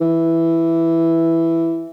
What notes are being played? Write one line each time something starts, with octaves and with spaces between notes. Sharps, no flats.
E3